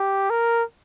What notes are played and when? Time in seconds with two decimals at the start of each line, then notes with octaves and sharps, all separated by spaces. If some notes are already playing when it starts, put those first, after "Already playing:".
Already playing: G4
0.30 A#4